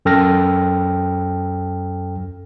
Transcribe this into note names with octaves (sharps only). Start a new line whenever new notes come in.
F#2 A4 G5 F6 A#6